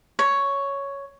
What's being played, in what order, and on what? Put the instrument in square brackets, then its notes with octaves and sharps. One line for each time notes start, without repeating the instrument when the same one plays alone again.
[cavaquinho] C#5